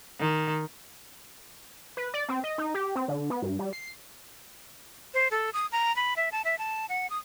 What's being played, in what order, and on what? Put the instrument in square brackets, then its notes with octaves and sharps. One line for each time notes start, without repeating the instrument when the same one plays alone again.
[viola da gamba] D#3
[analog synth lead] B4
D5
C4
D#5
D#4
G4
C4
D3
B3
G2
G3
C7
[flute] C5
A4
D#6
A#5
B5
E5
A5
E5
A5
F#5
D#6